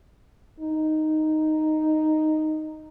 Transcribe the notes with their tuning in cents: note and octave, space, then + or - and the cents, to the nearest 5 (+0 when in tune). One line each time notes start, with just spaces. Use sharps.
D#4 -5